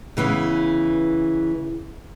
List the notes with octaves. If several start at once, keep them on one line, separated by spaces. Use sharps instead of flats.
C#3 E3 B3